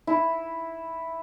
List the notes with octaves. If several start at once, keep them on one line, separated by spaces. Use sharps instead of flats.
E4